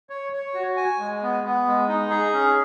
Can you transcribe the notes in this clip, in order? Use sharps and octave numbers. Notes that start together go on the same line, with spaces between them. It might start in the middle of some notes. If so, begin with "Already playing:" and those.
C#5
C#5
F#4
G#5
G#3
B3
B3
G#3
D#4
G#4
C#4